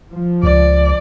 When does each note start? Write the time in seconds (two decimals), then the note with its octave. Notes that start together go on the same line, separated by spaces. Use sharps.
0.13 F3
0.43 C#2 D5